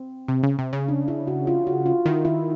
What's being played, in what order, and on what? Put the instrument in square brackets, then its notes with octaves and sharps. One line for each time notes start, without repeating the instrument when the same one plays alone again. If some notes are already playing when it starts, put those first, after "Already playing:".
Already playing: [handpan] C4
[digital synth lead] C3
C#3
C3
C#3
[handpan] D4
E4
F#4
F4
F#4
F4
[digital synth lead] D#3 [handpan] E4
[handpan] E4